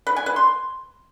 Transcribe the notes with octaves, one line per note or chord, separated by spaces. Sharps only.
B4
G#5
B4
C6